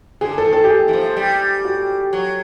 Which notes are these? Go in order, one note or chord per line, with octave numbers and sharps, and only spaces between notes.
D3 G#4
A4
D#3
A4
G4
G#4
E3
F3
G3
F#4
F#3